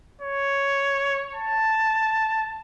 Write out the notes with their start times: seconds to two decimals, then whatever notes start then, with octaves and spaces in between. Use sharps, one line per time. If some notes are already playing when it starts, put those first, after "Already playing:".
0.22 C#5
1.35 A5